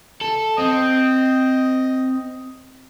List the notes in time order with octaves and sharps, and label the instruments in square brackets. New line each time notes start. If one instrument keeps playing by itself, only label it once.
[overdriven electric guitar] A4
[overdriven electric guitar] C4 [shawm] D#5